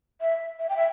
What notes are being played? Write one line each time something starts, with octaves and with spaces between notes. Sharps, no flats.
E5
E5
G5
E5